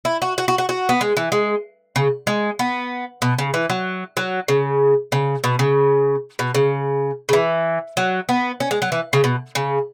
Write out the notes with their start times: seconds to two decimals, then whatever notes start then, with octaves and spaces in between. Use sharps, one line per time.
0.05 E4
0.22 F#4
0.38 F#4
0.48 F#4
0.58 F#4
0.69 F#4
0.89 B3
1.01 G#3
1.17 E3
1.32 G#3
1.96 C#3
2.27 G#3
2.59 B3
3.22 B2
3.38 C#3
3.54 E3
3.70 F#3
4.17 F#3
4.48 C#3
5.12 C#3
5.44 B2
5.59 C#3
6.39 B2
6.55 C#3
7.29 C#3
7.33 E3
7.97 F#3
8.29 B3
8.60 C#4
8.71 G#3
8.82 F#3
8.92 E3
9.13 C#3
9.24 B2
9.55 C#3